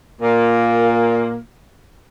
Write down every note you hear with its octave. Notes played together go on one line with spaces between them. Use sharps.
A#2 A#3